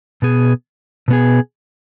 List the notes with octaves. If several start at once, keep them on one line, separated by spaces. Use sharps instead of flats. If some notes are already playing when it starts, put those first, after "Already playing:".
B2 B3 G#4
B2 B3 G#4